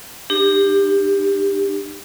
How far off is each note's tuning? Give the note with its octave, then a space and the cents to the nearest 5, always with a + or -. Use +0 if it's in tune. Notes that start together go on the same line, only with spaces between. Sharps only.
D4 +30 G4 +15